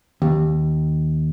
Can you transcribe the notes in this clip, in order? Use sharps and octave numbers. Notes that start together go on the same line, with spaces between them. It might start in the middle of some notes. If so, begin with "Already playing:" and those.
D#2